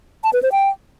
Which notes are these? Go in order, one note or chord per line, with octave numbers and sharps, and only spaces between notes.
A5
B4
C5
G5